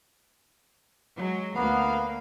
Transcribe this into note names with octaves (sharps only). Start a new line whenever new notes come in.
F#3 G#3
D2 A#3 B3 F5